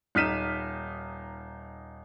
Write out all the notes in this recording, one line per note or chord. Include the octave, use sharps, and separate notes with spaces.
D#1 D#4 F6 B6 D#7 E7